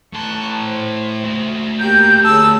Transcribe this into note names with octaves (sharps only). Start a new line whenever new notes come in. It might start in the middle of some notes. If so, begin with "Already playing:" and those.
A2 A5 C6 C#6 F#6
C5
A3 F#4
A#3 G4 A#4 G6
D3 G#4 A#4 C#5 A5 E6